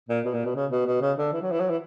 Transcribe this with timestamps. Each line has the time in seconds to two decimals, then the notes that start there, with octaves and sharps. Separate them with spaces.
0.09 A#2
0.25 B2
0.34 A#2
0.45 B2
0.56 C#3
0.71 B2
0.87 B2
1.01 C#3
1.18 D3
1.33 E3
1.42 F#3
1.52 E3
1.60 F#3
1.70 E3